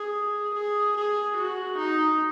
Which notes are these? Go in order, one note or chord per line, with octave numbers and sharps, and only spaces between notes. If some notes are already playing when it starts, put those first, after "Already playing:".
Already playing: G#4
G#4
G#4
F#4
D#4